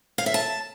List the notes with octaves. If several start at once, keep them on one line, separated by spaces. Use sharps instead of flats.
F5
E5
A5